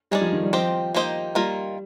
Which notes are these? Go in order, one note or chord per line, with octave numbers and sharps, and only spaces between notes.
G3 G#3 D#4 G#4 D5
F3
D#3
G3
F3 C4 G4 C5 D#5
A#3 D#4 G4 C5 D#5
D#3 G3 A#3 F4 A#4